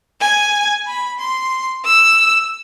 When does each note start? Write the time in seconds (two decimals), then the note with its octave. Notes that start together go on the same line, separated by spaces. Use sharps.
0.21 G#5
0.87 B5
1.19 C6
1.85 E6